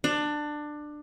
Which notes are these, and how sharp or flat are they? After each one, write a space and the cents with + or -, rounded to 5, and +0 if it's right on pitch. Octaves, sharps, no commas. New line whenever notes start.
D4 +20